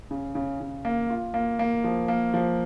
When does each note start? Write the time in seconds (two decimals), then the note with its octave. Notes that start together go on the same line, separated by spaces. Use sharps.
0.11 C#3
0.35 C#3
0.60 C#3
0.85 A#3
1.10 F4
1.34 A#3
1.59 A#3
1.84 F3
2.08 A#3
2.34 F3